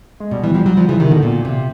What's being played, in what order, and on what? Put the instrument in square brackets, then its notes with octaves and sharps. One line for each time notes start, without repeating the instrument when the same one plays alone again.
[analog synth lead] G#3
[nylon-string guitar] B2 [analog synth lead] G3
[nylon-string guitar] E3 [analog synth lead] G3
[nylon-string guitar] F3 [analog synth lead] G3
[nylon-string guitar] F#3 [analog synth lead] G3
[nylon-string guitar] F3 [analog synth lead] G3
[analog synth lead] C#3 [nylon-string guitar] E3
[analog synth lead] C3 [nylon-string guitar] D#3
[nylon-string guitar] B2 [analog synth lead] D3
[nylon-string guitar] A#2
C3